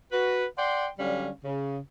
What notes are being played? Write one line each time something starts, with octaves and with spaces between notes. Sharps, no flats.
F#4 B4
D5 F#5 G5 C6
D3 F#3 G3 C#4 F5
C#3